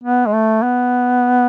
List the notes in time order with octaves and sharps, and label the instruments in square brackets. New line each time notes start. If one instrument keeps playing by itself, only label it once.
[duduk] B3
G#3
A3
B3